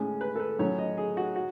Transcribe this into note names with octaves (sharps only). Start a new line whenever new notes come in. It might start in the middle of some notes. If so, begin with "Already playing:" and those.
Already playing: A2 G#3 C#4
B4
A4
B4
A2 F#3 C#4 C#5
D#5
G#4
F#4
F#4